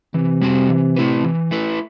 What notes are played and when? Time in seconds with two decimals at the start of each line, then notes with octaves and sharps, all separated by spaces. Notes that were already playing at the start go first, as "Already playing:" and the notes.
0.14 C3 E3
0.42 G3 C4 F#4
0.68 E3
0.96 A3 E4 B4
1.24 E3
1.51 A3 E4 B4